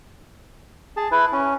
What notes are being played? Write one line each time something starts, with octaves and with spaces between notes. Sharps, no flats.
G#4 A5
E4 B4
C#4